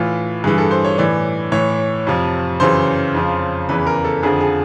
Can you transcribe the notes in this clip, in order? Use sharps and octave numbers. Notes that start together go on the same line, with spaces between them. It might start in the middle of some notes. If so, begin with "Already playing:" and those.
Already playing: A2 E3 F4
G2 E3 G#4
A4
C5
C#5
A2 E3 D5
A2 E3 C#5
F2 C3 F3
F#2 C#3 E3 C5
F2 C#3 F3
E2 C#3 E3 B4
A#4
A4
F2 D3 F3 G#4
G#4